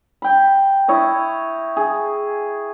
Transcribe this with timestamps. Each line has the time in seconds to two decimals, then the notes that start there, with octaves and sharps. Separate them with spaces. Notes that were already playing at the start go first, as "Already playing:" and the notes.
0.22 G5 B5
0.88 E4 C#5 D#5
1.77 G#4